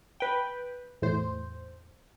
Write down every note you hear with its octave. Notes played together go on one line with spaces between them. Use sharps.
B4 G5
E2 A2 C5